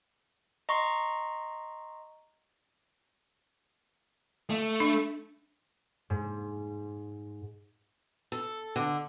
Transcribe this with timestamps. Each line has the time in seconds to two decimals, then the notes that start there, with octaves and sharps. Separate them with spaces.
0.69 D#5 A#5 C6 C#6
4.50 A3
4.80 D4
6.10 G#2
8.32 A4
8.76 D3